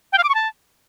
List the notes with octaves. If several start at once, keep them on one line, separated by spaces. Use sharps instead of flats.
G5
F5
D6
C#6
A5